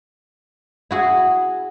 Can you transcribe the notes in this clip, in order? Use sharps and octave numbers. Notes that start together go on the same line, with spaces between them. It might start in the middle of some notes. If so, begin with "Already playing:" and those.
E4 F#4 G#4